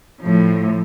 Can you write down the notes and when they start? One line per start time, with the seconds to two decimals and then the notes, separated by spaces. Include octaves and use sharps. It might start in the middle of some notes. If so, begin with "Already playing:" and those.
0.21 A2 F3